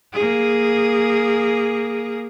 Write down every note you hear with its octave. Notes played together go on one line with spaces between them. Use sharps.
A#3 G#4